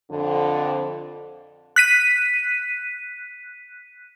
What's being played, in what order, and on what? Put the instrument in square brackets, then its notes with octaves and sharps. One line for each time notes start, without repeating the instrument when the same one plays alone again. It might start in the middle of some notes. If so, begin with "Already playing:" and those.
[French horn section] F2 D3
[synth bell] F#6 B6 D#7